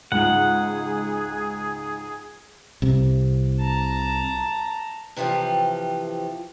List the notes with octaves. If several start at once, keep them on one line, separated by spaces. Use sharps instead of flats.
C#2 G#2 G#4 F#5
C2 C3
A5 A#5
C3 E3 F3 F4 G4